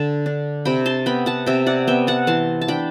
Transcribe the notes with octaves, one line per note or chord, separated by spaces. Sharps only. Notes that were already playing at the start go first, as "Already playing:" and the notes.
Already playing: D3 A5
D4
C3 G5 B5
A5 C6
B3 G5 B5
F#5 A5
C3 E5 G5
D5 F#5
B3 E5 G5
F#5 A5
E3 A5 C6
A5
D4 G5 B5